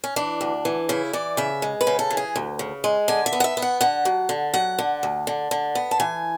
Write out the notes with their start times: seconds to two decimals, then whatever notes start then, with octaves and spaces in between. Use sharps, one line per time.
0.04 C#4
0.16 E3 D4
0.41 D2
0.65 E3
0.89 C#3 E4
1.13 E3 D5
1.37 C#3 E5
1.62 G#3
1.81 B4
1.87 C#3
1.99 A4
2.10 E3
2.17 G#4
2.36 D2
2.59 C#3
2.84 G#3
3.08 D3 G#5
3.26 E5
3.33 B3
3.40 F#5
3.44 E5
3.57 B3
3.62 F#5
3.81 D3 F#5
4.05 F#3
4.29 D3
4.54 F#3 F#5
4.78 D3
5.03 D2
5.27 D3
5.51 D3
5.75 B3
5.91 A5
6.00 E3 G#5